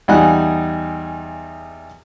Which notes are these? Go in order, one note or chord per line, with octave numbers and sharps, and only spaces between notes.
E2 G3 D#4 F#5 G#5 F#6